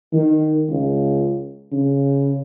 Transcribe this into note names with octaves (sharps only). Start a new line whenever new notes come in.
D#3
C#2
C#3